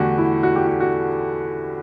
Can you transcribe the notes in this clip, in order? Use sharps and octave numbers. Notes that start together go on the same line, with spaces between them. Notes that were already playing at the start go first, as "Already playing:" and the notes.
Already playing: E2 D3 A3 F#4 G4
E4
F#4
G4
F#4
F#4